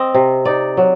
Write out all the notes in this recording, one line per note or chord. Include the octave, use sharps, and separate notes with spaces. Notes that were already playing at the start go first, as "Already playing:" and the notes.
Already playing: C4 D#5
C3
D#4 D5
F#3